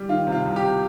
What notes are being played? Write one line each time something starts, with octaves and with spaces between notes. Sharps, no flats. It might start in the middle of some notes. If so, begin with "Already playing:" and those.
Already playing: G3
D#3 F4
C3
F4
C2
G4
C3